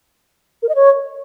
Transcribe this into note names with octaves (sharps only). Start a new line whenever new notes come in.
A#4
D#5
C#5